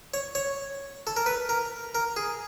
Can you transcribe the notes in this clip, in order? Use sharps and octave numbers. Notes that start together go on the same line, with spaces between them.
C#5
C#5
A4
A#4
B4
A#4
A#4
G#4